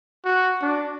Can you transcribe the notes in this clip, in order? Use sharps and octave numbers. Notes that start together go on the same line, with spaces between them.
F#4
D4